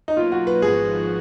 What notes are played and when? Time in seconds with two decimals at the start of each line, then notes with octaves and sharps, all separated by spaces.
0.08 D#4
0.17 B2 F#3 A#3 F4
0.32 F#4
0.47 B4
0.62 G#1 G#2 F3 B3 F#4 G#4